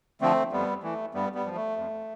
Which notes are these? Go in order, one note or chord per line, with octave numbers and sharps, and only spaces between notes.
D3 F3 A3 C4
F2 G3 B3
E3 A3
G2 G3 B3
G3 B3
F3
A3
F2